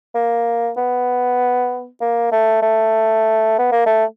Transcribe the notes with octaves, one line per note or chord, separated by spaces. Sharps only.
A#3
B3
A#3
A3
A3
B3
A#3
A3